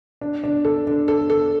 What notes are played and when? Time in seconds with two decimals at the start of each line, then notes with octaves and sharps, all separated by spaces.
0.21 D4
0.44 D4
0.65 A4
0.87 D4
1.08 A4
1.30 A4